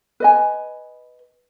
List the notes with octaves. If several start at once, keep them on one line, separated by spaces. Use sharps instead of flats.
B4 D#5 G#5